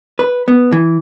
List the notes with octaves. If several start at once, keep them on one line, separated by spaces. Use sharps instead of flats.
B4
B3
E3